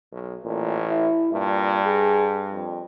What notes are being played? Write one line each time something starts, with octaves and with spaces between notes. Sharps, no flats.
B1
A1 A#2
E4
G2 A#2
G#4
F2